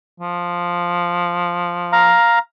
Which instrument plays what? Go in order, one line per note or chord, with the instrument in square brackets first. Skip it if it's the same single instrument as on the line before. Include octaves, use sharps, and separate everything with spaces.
[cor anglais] F3
[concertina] F5 A#5